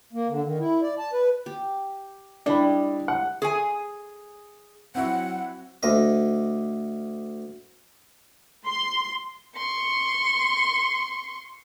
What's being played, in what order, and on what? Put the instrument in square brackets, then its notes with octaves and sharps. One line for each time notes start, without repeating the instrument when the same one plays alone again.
[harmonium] A#3
D3
D#3
E4
D5
A5
B4
[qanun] G4
[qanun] G3 E4 D#5 [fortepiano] D4 B5
[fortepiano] F#5
[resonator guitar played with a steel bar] G#4 G#5
[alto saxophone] F#3 [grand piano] C4 E4 F#4 [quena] F#5
[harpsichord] D2 D#5
[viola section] C6
[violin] C6 C#6